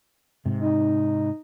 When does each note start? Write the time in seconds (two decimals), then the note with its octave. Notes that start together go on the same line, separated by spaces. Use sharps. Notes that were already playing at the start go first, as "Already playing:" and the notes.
0.46 G#2 C3
0.60 D#4